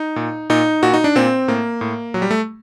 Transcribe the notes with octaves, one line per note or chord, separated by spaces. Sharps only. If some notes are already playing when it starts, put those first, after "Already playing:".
Already playing: D#4
A#2
A#2 D#4
A#2 F#4
D#4
D4
A#2 C4
A2 A#3
A2
A#2 F#3
G3
A3